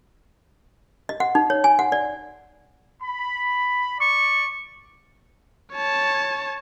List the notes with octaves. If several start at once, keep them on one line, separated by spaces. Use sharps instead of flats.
D#5
F#5
D#4
C#5
G#5
F#5
D5
B5
D5 C#6
C#5 A5